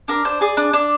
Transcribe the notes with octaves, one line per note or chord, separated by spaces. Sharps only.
D4 A#4
D4 C5
G#4 D5
D4
D4